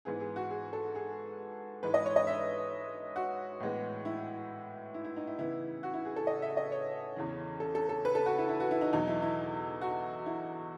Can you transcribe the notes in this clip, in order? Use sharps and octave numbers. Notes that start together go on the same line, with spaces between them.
G#2 E3 B3 G#4
G#4
F#4
G#4
A4
G#4
G#2 E3 G#3 B4
D#5
C#5
D#5
E5
F#4
A2 E3 G#3 B3
E4
E4
E4
D#4
E4
C#3 E3 B3 E4
F#4
E4
G#4
A4
D#5
E5
D#5
C#5
E2 C#3 E3
A4
A4
A4
B4
A4
F#4
E4
E4
F#4
E4
D#4
E2 B2 F#3 D#4
E4
E4
F#4
E4